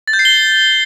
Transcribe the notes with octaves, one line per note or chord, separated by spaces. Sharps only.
A6
G6
C7
G7